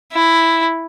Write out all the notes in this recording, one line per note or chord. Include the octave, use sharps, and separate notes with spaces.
E4